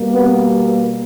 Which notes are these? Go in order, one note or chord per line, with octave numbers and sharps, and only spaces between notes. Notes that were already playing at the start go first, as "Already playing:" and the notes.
Already playing: B2 G3 A#3
B3